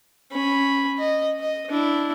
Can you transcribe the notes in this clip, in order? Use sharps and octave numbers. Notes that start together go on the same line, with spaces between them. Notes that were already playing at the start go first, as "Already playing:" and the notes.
C#4 B5
D#5
D#5
D4 E4